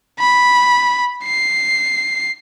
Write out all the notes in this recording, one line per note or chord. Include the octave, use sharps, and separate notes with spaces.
B5
C7